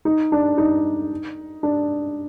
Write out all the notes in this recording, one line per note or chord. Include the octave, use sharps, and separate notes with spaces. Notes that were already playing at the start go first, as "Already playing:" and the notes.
D#4
D4
D#4
D4